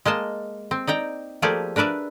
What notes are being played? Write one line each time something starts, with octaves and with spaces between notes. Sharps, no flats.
G#3 A#3 D#5 A5
C4
D#4 D5 G5 A#5
F3 A3 A#3 G4 G#4 D5
D4 A#4 B4 D5 E5